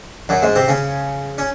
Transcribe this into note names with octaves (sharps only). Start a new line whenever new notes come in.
F#2 F#3
G#2 G#3
C3 C4
C#3 C#4
C#4